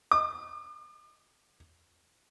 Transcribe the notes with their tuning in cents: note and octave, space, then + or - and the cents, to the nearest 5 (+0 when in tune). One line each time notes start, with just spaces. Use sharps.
D6 +45